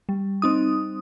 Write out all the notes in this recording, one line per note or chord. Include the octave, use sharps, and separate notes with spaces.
G3
C4 D#4 D#6